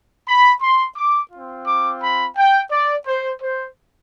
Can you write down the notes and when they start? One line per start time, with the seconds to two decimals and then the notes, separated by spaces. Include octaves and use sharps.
0.27 B5
0.61 C6
0.96 D6
1.32 C4 F4
1.66 D6
2.02 B5
2.37 G5
2.71 D5
3.07 C5
3.41 C5